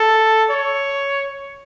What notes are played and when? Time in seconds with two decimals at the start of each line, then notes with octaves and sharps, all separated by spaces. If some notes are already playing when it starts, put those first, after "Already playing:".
Already playing: A4
0.50 C#5